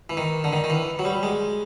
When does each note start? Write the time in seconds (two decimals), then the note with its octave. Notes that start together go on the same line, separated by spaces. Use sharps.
0.10 E3
0.17 D#3
0.44 D3
0.53 D#3
0.64 D#3
0.70 E3
0.99 F#3
1.05 G3
1.23 G#3